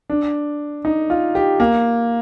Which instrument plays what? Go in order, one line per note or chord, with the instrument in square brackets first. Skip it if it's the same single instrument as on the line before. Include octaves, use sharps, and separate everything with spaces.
[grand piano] D4
D#4
F4
G4
A#3